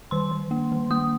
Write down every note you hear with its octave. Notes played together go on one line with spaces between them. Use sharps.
D#3 C6
D#3
A#3
D#3
A#3 D#6